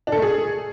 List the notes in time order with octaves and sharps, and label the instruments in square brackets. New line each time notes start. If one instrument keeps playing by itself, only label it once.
[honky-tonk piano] D4
A4
A3
G#4